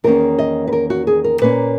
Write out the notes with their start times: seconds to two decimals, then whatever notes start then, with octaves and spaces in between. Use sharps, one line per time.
0.04 E2 D#3 A#3 C#4 A#4
0.38 D#5
0.67 B4
0.73 A#4
0.90 F#4
1.07 G#4
1.24 A#4
1.41 A#2 A#3 C#4 B4